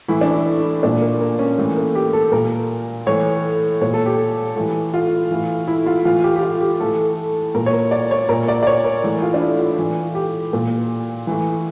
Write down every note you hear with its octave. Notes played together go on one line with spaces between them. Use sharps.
A2 E3 E4
D4
E4
A#2 D4
A#3
A#3
C#4
A2 E3 A3
A#3
G4
A4
A#2 A#4
A2 E3 C#5
A#2 C#5
A4
G4
A2 E3
F4
A2 E3
E4
F4
A2 E3 F4
G4
G4
F4
G4
A2 E3 A4
A#2 A#4
C#5
A#4
D5
C#5
A#2 A#4
D5
D5
C#5
A#4
A2 E3
F4
D4
E4
F4
A2 E3
G4
A#2
A2 E3